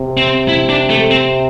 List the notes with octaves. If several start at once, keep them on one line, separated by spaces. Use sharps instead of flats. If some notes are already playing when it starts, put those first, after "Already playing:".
Already playing: C3
C4
E4
D4
A3
C4